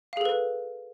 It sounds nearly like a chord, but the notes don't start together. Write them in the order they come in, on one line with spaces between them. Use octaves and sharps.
F5 G#4 A4 B4